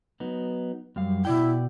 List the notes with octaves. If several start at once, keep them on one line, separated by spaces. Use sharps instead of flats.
F#3 B3 D#4
F#2 G3 F5
B2 E4 D5 G5